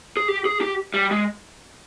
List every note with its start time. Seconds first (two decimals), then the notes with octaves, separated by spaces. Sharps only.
0.17 G#4
0.28 G4
0.45 G#4
0.61 G4
0.94 G3
1.11 G#3